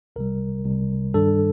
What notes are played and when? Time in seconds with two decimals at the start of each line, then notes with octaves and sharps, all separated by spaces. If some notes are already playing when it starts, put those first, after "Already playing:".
0.16 C2 C3 G3 A#4
0.65 C2 C3 G3
1.14 G2 D#3 G3 D4 A4